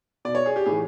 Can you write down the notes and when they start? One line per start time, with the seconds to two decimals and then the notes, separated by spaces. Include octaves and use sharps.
0.25 B2 D5
0.35 C#5
0.46 G#4
0.56 G4
0.66 A2 E3 G#4